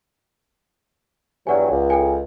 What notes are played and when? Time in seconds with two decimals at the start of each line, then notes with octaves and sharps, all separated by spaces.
1.47 E2 G2 F#3 D5 F#5 G#5
1.71 C#2
1.90 A4 G5 G#5